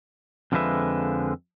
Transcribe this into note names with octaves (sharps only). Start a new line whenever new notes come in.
F2 D3 F3 G#3 B4 E5